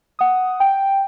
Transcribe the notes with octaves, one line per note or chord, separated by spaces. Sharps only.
F#5 D#6
G5